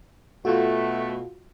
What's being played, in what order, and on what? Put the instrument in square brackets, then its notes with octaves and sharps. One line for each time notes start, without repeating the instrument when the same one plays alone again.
[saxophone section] B2 A3 [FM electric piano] F4 F#4